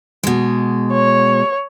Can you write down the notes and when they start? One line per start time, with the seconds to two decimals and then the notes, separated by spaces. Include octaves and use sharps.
0.23 B2 G#3
0.92 C#5